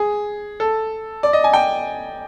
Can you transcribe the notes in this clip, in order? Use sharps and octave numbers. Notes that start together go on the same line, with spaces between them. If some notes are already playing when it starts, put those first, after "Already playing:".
Already playing: G#4
A4
D5
D#5
G#5
G5